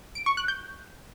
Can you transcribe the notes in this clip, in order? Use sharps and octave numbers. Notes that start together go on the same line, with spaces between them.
D7
C#6
F#6
G6